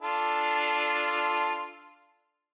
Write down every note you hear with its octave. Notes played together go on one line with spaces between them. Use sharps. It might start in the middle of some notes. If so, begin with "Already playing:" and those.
D4 F4 A4